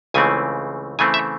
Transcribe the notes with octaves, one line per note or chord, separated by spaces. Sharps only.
C#2 C#3 E3 A3 C4 G#5
C#3 E3 A3 C4 G#5
E5